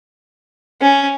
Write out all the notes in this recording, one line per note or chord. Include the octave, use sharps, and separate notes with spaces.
C#4